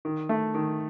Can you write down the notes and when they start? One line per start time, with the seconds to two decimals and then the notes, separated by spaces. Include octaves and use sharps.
0.05 D#3
0.29 A3
0.55 D#3